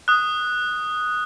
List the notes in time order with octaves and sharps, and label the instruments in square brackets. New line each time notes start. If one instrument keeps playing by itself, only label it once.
[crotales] D#6 F#6